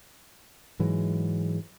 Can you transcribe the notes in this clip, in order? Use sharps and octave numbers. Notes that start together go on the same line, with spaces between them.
G#2 E3 F#3 G#3